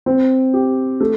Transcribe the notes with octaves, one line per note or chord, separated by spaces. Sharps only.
C4
G4
A3